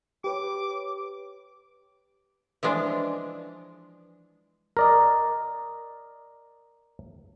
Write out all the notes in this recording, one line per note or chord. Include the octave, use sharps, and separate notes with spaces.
G4 B4 C#5 D6
E3 F3 G#3 D4
A#4 D5 D#5